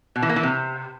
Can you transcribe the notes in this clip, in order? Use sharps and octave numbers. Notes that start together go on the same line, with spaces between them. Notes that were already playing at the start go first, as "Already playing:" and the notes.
B2
E3
A#3
E3
C3